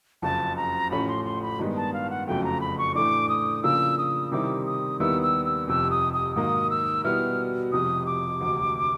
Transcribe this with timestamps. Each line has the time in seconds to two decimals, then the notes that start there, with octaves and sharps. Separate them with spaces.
0.22 F#1 F2 C#3 A5
0.56 A#5
0.90 A1 A2 F3 A3 C#4 B5
1.08 C6
1.25 C6
1.42 B5
1.59 G2 D#3 G#3 B3
1.76 A5
1.93 F5
2.10 F#5
2.27 F#1 F2 C#3 F#3 A3 G5
2.44 A#5
2.61 B5
2.78 C#6
2.95 A2 E3 A3 D4 D6
3.29 D#6
3.63 C#3 F3 A#3 D4 E6
3.98 D#6
4.31 C3 D#3 G3 C4 E4 D6
4.66 D#6
5.00 D#2 D#3 G3 B3 E4 E6
5.22 E6
5.45 E6
5.68 F1 F2 C3 E6
5.91 D#6
6.13 D#6
6.36 G#2 D#3 F#3 A#3 D#6
6.70 E6
7.04 B2 G3 B3 E4 F6
7.72 F1 F2 C3 D#6
8.06 D6
8.41 E1 D2 C3